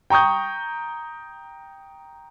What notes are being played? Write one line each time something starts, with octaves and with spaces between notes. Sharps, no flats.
G5 A#5 C#6 D#6 G6